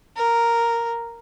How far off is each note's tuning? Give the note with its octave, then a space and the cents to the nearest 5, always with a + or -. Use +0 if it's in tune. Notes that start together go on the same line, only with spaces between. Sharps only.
A#4 -5